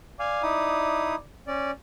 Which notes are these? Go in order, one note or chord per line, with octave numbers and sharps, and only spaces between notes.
D5 F5 G#5
D#4 E4 D#6
C#4 D5